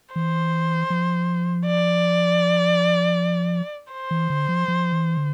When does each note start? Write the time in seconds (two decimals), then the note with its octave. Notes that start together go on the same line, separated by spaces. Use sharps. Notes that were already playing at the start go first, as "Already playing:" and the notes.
0.15 E3 C5
0.90 F3
1.66 D5
3.92 C5
4.11 E3
4.30 D3
4.48 F3
4.68 F3
4.92 E3
5.17 D3